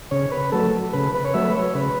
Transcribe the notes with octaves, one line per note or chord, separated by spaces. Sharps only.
C#3 C#5
B4
F#3 A3 A4
C#3 B4
B4
C#5
F#3 A3 E5
B4
C#5
C#3 B4